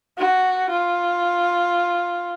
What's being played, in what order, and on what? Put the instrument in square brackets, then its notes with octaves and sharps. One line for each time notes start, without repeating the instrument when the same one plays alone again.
[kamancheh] F#4
F4